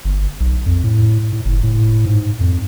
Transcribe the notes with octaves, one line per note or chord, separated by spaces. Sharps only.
G1
B1
F2
A2
A2
F#1
A2
G#2
F2